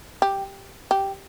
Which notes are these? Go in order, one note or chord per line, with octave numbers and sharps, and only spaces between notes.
G4
G4